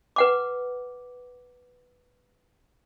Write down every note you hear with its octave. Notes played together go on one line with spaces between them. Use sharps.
B4 F#5 D6